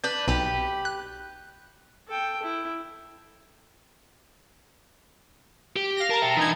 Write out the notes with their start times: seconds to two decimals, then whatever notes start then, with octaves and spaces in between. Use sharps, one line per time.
0.04 D4 B4 G6
0.28 B1 G4 B4
0.85 F#6
2.08 A4 G5
2.42 E4
5.76 G4
5.97 F5 A#6
6.10 A#4 A5 A#5
6.22 E5 G5
6.37 E3 D4 D#4 G#6